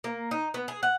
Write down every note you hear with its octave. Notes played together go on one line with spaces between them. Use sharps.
A#3
D#4
B3
G#4
F#5